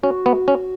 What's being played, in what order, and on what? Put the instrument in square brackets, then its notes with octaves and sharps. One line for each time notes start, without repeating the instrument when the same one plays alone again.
[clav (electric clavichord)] C#4 [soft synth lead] F#4
[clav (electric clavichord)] B3
C#4